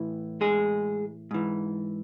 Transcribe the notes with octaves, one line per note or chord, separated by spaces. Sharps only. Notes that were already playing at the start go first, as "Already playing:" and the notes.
Already playing: A2 E3
G#3 G#4
G#2 E3